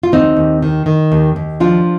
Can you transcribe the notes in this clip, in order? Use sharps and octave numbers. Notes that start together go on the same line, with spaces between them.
F4
D#2 C4 D#4
D#2
D#3
D#3
D#2
D#2
F3 D4 F4